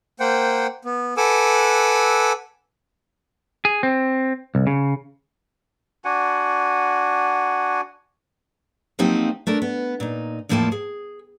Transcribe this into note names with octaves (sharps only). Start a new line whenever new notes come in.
A#3 C5 F#5 G5
B3
A4 B4 F#5 G#5 D6 E6
G#4
C4
C2
C#3
D4 F#4 F#5 G#5
F3 F#3 A#3 C4 D#4 G4
A3 D4 A#4
B3
A#2 D#4
E2 A2 F3 A#3 G5 A5
G#4